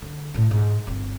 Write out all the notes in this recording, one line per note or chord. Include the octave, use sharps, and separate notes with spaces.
D3
A2 A3
G#2
G1 C4